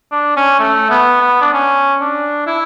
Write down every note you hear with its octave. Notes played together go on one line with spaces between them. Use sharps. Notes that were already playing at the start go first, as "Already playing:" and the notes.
D4
C#4
A3
B3
B3
D4
C#4
D4
E4